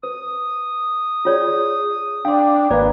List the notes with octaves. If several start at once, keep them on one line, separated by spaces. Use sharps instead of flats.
B4 D#6
F4 G#4 C#5 D5
D4 F5 G5 C6
G#1 A#3 B4 D5 F5 A#5